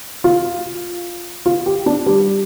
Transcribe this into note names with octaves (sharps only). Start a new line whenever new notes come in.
F4
F4
G4
D4
G3